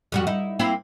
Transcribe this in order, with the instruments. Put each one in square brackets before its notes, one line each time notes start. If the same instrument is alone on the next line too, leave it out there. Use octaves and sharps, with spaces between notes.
[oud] F2 G3 F#4
D#4 E4
A#3 C4 E4